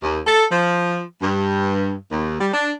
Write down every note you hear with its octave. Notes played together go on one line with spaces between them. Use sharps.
D#2
A4
F3
G2
D#2
G3
D4